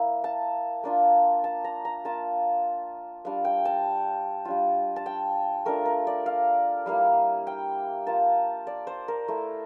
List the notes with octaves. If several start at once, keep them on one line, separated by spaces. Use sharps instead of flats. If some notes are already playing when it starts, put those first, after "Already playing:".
Already playing: A#3 E4
A5
A#3 D4 F4
A5
A#5
A#5
A#3 F4 A5
G3 D4 F4 F5
G5
A5
G3 D4 F4
A5
G5
A3 D4 F4 A#4
A#4
D5
F5
G3 A#3 E4 F5
G5
A#3 F4 A5
D5
C5
A#4
A3 E4